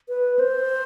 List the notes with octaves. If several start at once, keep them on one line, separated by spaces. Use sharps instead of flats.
B4
C5